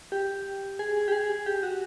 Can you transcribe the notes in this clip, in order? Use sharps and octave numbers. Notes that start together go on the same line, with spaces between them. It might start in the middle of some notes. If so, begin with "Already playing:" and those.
G4
G#4
G4
G#4
G4
F#4